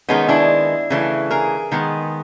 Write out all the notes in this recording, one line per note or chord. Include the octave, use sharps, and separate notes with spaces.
D#3 G#3 B3 C#4 D#4
D4 E4
C#3 E3 A3
G#4 A#4
D#3 G#3 B3